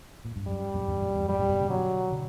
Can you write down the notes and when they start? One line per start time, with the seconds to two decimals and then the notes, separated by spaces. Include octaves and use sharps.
0.25 A#2
0.36 G2
0.47 F#2 G3
0.74 F#2 A#2
0.87 E2 G2
1.01 F#2 A#2
1.15 E2 G2
1.28 F#2 A#2 G3
1.39 F#2 A#2
1.49 G2 B2
1.59 A#2 C#3
1.69 B2 D3 F#3
2.10 B2 D3